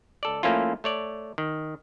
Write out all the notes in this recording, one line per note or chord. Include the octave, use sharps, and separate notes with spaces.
C#2 A4 D5
F3 A3 A#3 C#4 E4 F4
A3 C#5 D5
D#3